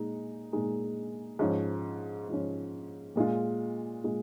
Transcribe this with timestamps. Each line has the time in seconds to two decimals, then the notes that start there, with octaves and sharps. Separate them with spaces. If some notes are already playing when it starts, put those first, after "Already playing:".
Already playing: A#2 G#3 D#4
0.52 A#2 G#3 D#4
1.39 G#2 F3 C#4
2.28 G#2 F3 C#4
3.16 A#2 G#3 F4
4.04 A#2 G#3 F4